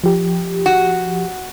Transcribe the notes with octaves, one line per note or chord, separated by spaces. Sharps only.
F3 G4
F#4